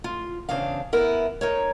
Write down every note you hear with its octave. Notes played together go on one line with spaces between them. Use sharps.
F4
E2 C#3 C4 D4 F5
B3 E4 A#4
D#4 A#4 C#5